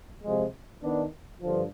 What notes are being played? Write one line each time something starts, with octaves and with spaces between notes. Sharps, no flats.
C3 F3 G#3
D#3 B3 D4
G2 D3 F3